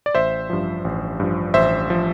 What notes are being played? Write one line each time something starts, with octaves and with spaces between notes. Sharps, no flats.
D5
A1 C5 E5
G2 F3
A1
G2 F3
A1 C5 E5
F3